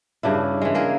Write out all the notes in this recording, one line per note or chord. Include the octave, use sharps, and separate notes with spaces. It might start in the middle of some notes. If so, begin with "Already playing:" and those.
G2 C#3 D4 E4
E3 G#3
A#3 G#4 A#4